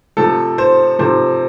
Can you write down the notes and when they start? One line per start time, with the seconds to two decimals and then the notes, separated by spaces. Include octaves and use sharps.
0.17 C3 F3 A3 A4
0.58 C5
0.99 C3 F3 A3 C5